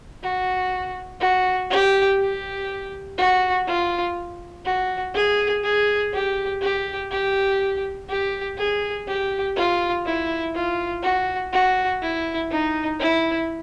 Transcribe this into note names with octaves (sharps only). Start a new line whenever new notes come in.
F#4
F#4
G4
G4
F#4
F4
F#4
G#4
G#4
G4
G4
G4
G4
G#4
G4
F4
E4
F4
F#4
F#4
E4
D#4
E4